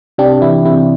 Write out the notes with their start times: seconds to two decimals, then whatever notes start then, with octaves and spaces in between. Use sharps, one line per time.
0.18 C3 D4 G4
0.42 E3 E4
0.65 C3 E4